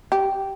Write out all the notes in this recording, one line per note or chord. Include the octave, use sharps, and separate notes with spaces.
G4